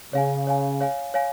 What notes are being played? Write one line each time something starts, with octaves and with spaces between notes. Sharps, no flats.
C#3 C#5 F5 G#5
C#5 F5 G#5
C#5 F5 G#5
C#5 F5 G#5